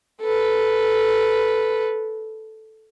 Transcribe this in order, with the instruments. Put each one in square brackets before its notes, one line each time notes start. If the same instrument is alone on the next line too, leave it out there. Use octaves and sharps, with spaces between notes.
[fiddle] A4 B4